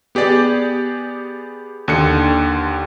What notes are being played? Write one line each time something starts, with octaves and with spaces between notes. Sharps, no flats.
B3 G4 G#4 D5
D#2 D3 C#7